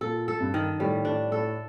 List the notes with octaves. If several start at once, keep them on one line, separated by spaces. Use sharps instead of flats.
A#2 A4
A4
G2
D#3
A2 G3
A2 D4
A2 A4